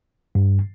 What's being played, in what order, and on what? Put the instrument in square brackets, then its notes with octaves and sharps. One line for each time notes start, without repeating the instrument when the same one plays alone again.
[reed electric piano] G2